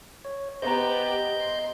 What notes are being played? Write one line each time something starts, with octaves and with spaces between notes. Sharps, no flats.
C#5
B3 G4 C5 D#5 A#5 G6
C6